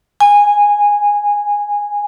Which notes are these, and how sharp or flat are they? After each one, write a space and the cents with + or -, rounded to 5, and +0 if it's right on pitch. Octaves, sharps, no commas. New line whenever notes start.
G#5 -20